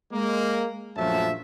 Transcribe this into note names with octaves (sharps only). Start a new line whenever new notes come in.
G#3 A#3
A#1 F#2 F3 A3 E5 A5